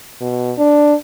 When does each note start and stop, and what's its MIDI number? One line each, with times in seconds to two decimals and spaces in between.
0.21 0.53 47
0.58 0.94 62